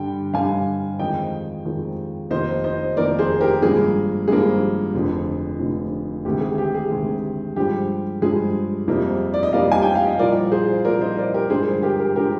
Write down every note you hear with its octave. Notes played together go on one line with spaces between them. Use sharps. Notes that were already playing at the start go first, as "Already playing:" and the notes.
Already playing: G2 D3 G3 G5
G2 D3 G3 F5 G#5
F2 D#3 G#3 D#5 G5
F2 D#3 G#3
F1 F2 D#3 A#3 C5 D#5
C5 D#5
F1 F2 D#3 A#3 A#4 D5
G#4 C5
G4 A#4
G#1 G2 F3 A#3 G#4
G#1 G2 F3 A#3 G#4
F1 F2 D3
F1 F2 D3
D2 C3 D#3 G#3 G4
G#4
G4
G#4
D2 C3 D#3 G#3
G2 F3 G#3 G4
G2 F3 G#3 G#4
F2 C3 G3 A#3
D5
D#5
F2 C3 G3 A#3 D5 F5
G#5
G5
F5
D#5
C2 A#2 F3 A#4 D5
G#4 C5
C2 A#2 F3 A#4 D5
C5 D#5
A#4 D5
G4 A#4
G2 D3 F3 G#3 G#4 C5
G#4
G4 A#4
G4 A#4
D3 F3 G#3 G4 A#4